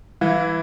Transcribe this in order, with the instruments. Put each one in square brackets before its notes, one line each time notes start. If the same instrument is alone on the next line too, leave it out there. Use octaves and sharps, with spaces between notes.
[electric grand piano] E3 E4 [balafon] G3